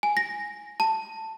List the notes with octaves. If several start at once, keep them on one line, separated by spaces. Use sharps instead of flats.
G#5
A#6
A5